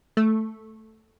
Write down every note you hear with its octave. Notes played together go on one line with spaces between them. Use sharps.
A3